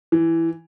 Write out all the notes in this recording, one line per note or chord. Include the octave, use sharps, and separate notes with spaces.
E3